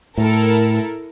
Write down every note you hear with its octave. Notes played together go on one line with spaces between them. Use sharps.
A2 E4 A4 A#4